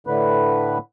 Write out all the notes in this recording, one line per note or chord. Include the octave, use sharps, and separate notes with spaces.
A2 D3 B4